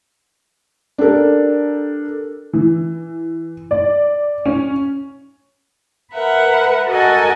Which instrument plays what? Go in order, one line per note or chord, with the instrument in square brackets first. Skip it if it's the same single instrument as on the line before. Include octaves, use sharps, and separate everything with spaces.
[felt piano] D4 G4 A4 A#4
[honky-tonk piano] E3
D5
C#4
[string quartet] A#4 B4 E5 F#5
F#4 A4 A#4 D#5 F#5 G#5